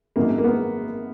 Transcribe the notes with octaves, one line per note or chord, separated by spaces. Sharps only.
G#1 F#2 D#3 A#3
A#3
B3